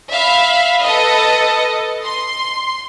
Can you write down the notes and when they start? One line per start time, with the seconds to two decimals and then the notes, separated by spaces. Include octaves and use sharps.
0.11 E5 F5 B5
0.81 A4 B4 D#5
2.05 C6